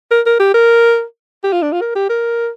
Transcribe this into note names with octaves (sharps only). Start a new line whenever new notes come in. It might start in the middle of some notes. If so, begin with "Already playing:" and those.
A#4
A#4
G4
A#4
G4
F4
D4
F4
A#4
G4
A#4